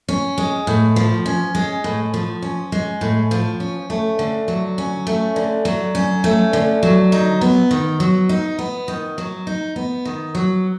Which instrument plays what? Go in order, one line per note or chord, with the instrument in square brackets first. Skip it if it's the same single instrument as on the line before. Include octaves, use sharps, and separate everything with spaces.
[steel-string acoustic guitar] C#4
G#3
A2
F3
C#4
G#3
A2
F3
C#4
G#3
A2
F3
C#4
A3
D3
F#3
C#4
A3
D3
F#3
C#4
A3
D3
F#3
D#4
B3
D#3
F#3
D#4
B3
D#3
F#3
D#4
B3
D#3
F#3